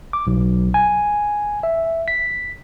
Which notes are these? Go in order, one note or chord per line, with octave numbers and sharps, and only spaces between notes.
D6
B1
G#5
E5
B6